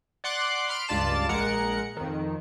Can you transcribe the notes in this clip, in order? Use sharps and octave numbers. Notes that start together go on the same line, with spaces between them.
D5 F#5 C6 D6 F#6
B5 C6 F6 D7
C#2 G2 F4 D5 A5 E7
A#1 G#3 A#4 F#5 C#7
F2 D#3